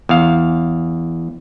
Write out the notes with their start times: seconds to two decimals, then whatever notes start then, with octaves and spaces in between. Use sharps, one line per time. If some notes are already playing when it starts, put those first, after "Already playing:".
0.09 E2 F5